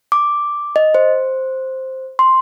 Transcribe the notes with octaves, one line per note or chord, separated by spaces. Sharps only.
D6
D#5
C5
C6